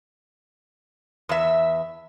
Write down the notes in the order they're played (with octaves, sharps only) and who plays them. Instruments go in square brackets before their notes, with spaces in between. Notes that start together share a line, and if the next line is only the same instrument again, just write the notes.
[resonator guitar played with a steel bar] E2 E5